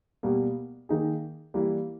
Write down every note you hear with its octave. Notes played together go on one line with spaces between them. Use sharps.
B2 G3 A#3
D#3 A#3 D#4 G#4
E3 G3 A#3